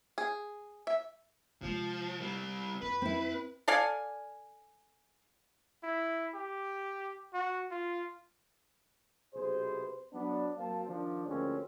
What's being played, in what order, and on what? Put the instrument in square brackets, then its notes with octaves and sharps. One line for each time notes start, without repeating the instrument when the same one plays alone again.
[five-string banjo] G#4
E5
[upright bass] C3 G#3 [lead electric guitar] F3
[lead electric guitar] G3 C4
[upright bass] F2 [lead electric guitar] B4
[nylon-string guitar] C4 E4
[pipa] A4 D5 F5 G#5
[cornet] E4
G4
F#4
F4
[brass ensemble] B1 C3 G#4 B4 C5
F#3 B3 D4
F#3 A#3 C4 F5 A5
D#3 F3 D4
D2 F3 G#3 A#3 C4 C#4